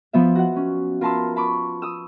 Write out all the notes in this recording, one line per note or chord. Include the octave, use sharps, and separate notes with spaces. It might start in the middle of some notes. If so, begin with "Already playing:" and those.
F3 B3 E5
F#4 F#5
C#4
F4 A#4 B4 A5 C6 E6
A5 B5 C#6 D6
D#6 E6